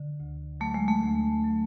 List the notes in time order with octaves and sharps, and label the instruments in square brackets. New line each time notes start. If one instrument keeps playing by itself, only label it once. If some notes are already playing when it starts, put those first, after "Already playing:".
Already playing: [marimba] D3
D2
[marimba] F#3 [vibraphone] A3
[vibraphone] G#3
A3
[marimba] D2
F#3